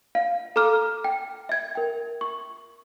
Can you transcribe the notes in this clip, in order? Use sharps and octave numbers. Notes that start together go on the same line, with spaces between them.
F5
A4 A#5 D6 F6
G5
E5 G#6
A#4 G5
C#6